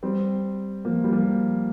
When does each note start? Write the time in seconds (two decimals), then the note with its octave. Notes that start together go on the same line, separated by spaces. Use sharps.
0.03 G3 C4
0.85 F3 A#3
1.04 G3
1.12 F3 A#3